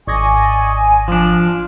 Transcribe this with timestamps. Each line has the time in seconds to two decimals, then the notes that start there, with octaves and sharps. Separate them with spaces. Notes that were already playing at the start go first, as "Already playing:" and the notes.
0.07 G#1 D5 D#5 G#5 C#6 G#6 A#6
1.08 F3 D4 F5